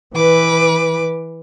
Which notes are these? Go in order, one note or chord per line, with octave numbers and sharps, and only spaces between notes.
E3 B4 D6